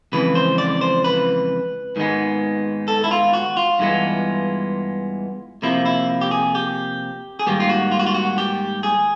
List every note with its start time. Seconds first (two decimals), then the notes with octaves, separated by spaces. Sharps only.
0.12 F2 C#3 E3 G#3 B4
0.35 C5
0.58 D5
0.81 C5
1.04 B4
1.96 G#2 D#3 G#3 B3
2.88 A4
3.04 E4
3.11 F4
3.33 F#4
3.57 F4
3.79 G2 E3 G#3 B3
5.62 C3 F3 A#3 E4
5.86 E4
6.21 G4
6.31 G#4
6.55 G4
7.39 G#4
7.47 G#2 D#3 G3 A#3 G4
7.60 F4
7.69 F#4
7.92 F4
7.99 F#4
8.06 F4
8.14 F#4
8.38 G4
8.83 G#4